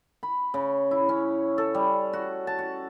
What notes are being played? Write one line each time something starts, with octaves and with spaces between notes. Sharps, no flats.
B5
C#3
E4
C#4
A4
G3
F#4
A5
F#4